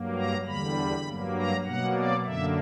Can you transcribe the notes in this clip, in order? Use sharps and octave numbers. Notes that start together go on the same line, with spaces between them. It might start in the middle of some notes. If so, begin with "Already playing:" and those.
Already playing: G2 F#3 A#3
A#5
E2 D3 G3 B5
G2 F#3 A#3
A#5
B2 F#3 A#3 F#5
D5
F#2 D3 A#3 E5